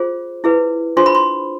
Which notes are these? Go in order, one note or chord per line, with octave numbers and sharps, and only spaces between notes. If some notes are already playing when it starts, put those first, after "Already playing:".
Already playing: F4 G#4 C5
E4 G#4 B4
D4 F4 G#4 C5 C6
B5
C6